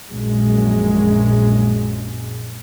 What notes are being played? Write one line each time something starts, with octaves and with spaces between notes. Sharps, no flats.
A#1 F#2 G#3